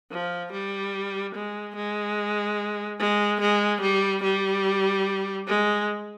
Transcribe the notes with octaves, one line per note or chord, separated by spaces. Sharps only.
F3
G3
G#3
G#3
G#3
G#3
G3
G3
G#3